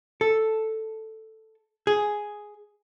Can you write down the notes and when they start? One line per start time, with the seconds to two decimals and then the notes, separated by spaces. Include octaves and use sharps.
0.21 A4
1.87 G#4